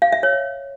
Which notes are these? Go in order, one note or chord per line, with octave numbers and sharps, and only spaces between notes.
F5
E5
C#5